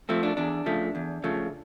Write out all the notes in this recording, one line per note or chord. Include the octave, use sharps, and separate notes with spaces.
F3 A3 C4
D4
E2 D4
C#3 F3 A3
E2
C#3 F3 A3